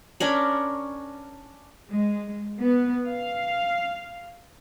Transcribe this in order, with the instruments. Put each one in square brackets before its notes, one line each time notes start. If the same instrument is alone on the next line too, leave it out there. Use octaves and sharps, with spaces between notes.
[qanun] C#4 D4 A#4 B5
[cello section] G#3
B3
F5